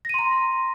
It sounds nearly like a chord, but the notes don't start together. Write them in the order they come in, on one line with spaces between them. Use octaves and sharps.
A#6 D#7 C6 A#5